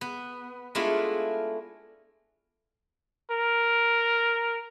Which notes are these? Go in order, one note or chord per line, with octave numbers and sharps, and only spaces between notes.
B3
G#3 A3 B3 D4 E4 F4
A#4